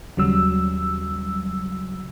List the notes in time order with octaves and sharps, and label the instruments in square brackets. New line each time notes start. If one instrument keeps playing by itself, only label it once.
[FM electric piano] D#2 C#3 F#3 G3 E6